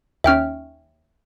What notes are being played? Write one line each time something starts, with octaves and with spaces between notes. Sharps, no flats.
D#2 C#4 E5 G5 F6